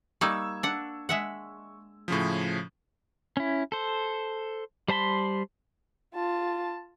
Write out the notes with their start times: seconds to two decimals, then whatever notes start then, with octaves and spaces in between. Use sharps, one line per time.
0.21 G3 A#3 D#4 C#6 E6 G#6
0.63 D4 F#5
1.09 G#3 E5 F#5
2.08 A2 C#3 F3
3.37 C#4 E4
3.72 A4 C5
4.88 G3 C5 A5 B5 C6
6.14 F4 A5